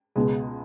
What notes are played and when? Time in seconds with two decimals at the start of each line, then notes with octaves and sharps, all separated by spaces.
0.16 C#2 B2 G#3